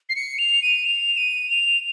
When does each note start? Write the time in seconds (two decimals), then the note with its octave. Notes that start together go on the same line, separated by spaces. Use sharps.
0.09 C7
0.16 C#7
0.38 F7
0.63 D#7
0.86 F7
1.17 D#7
1.49 F7